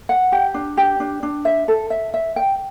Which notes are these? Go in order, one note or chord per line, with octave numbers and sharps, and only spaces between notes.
F#5
G4
D4
G4
D4
D4
E5
A4
E5
E5
G5